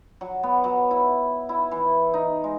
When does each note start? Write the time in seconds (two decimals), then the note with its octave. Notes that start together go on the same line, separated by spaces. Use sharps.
0.21 F#3
0.43 B3
0.64 F#3
0.91 E4
1.49 E4
1.71 E3
2.14 D#4
2.44 G#3